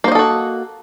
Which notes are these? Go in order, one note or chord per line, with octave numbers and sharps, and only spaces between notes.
A#3 F#4 A4 C5 D#5